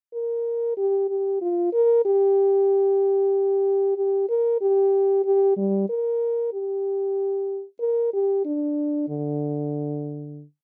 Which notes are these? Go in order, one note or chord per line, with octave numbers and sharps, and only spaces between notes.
A#4
G4
G4
F4
A#4
G4
G4
A#4
G4
G4
G3
A#4
G4
A#4
G4
D4
D3